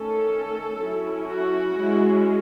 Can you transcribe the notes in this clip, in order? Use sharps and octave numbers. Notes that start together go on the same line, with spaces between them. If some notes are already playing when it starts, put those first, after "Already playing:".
Already playing: D#3 A3 C#4 A4
F#3 C#4 E4
F#4
G#3 C#4 E4